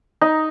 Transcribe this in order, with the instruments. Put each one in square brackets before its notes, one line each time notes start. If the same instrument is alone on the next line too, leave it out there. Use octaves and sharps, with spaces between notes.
[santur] D#4